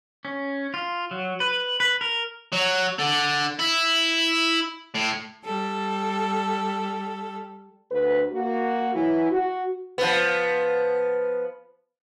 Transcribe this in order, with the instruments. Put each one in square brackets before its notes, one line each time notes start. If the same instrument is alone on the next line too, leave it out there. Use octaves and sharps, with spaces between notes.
[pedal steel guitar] C#4
F4
F#3
B4
B4
A#4
[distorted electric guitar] F#3
D3
E4
A2
[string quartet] G3 A4
[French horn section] D2 B4
A#3 F#4
E3 F#3 E4
F#4
[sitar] F3 B3